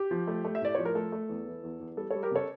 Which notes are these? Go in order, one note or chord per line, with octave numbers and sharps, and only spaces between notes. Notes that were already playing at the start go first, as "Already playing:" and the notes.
Already playing: G4
F3
A3
A3
E5
A2 D5
F3 C#5
A#4
A3 A4
A3
E2
E3
E2
E2
G3 A4
G3 A4 C#5
G4 A#4
C#3 A4 C#5